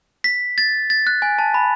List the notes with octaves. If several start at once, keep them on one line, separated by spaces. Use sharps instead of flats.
B6
A6
A6
F#6
G#5
A5
B5